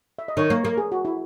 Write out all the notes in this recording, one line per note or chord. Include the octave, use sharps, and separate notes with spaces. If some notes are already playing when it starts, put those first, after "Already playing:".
E5
D#5
D#3 C#5
A#3 C#5
A#3 A#4
G#4
F#4
E4